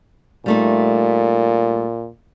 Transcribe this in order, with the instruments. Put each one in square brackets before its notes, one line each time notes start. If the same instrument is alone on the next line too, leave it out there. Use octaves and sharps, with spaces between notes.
[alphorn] A#2 [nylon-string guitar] G3 A3 D#4